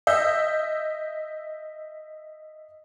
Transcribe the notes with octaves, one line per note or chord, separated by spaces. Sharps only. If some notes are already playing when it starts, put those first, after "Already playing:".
D#5 E5 E6 G6